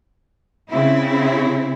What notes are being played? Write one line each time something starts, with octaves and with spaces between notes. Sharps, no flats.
C#3 C4 E4